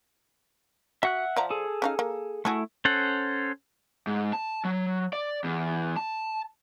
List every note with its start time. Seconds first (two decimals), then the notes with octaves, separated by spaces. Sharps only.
1.03 F#4 E5 F#5 F#6
1.36 F3 D5 A#5
1.50 G#4 A4
1.82 C#4 D#4 F5
1.99 A#3
2.45 A3 E4 F#4 G#4 A4
2.85 C#4 A4 C5 F#5
4.07 G#2
4.33 A5
4.65 F#3
5.13 D5
5.44 E2
5.97 A5